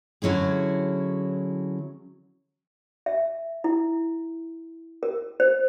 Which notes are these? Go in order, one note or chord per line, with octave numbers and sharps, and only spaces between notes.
D3 F#3 C#4 E4 G#4
E5
E4
A#4
C5